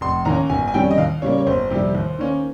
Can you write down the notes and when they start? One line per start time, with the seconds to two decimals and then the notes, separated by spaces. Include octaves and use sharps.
0.01 F1 C6
0.25 D#2 D#3 A#3 C#4 A#5
0.50 G1 G#5
0.68 G#5
0.74 F2 D#3 G3 C#4 G5
0.91 D#5
0.98 D#2 F5
1.22 C#3 G3 A#3 C#5
1.38 C#5
1.47 G1 C5
1.71 F2 C3 D#3 G3
1.95 D#2
2.19 D#3 A#3 C#4